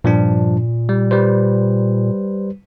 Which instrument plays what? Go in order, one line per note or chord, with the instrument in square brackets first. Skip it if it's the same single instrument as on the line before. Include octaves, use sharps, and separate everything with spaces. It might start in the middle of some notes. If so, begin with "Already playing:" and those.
[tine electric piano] G2 F3 D4 [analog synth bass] A#2
[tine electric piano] G3
G3 B4 C5